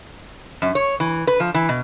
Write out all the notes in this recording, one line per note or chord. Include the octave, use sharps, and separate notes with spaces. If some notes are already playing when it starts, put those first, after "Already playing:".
F#2
C#5
E3
B4
F3
E3
B2